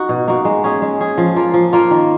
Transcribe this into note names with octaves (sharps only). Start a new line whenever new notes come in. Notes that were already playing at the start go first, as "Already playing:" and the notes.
Already playing: D#4 F#4
B2
A#3 D#4 F#4
G#3
C#4 G#4
G#3
C#4 G#4
F3
A#3 F4
F3
A#3 F4
D#3